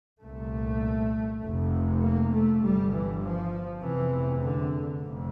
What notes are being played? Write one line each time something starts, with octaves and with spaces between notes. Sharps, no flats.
C2 A#2 A3
F1 F2 C3
A#3
A3
G1 G2 G3
E3
F3
F1 E2 C3 E3
D3
F1 F2 C3